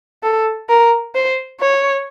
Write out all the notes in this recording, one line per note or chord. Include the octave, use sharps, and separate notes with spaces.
A4
A#4
C5
C#5